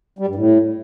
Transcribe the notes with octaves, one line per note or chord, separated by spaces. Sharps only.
G3
G2
A2